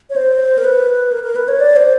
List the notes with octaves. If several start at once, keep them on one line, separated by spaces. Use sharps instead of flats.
C#5
C5
A#4
B4
A#4
A#4
B4
C#5
D5
C5